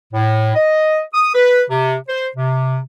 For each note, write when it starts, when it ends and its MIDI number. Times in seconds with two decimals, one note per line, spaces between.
0.12 0.53 45
0.55 1.01 75
1.14 1.33 87
1.35 1.63 71
1.69 1.95 48
2.08 2.27 72
2.36 2.79 48